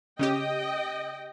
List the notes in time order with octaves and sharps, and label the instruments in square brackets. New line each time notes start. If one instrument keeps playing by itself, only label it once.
[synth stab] C#3 C#4 G4 [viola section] D#5 G5